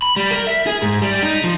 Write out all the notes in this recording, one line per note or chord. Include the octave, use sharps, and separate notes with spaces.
B5
G3
A#4
E5
G#4
G#2
G3
D#4
F3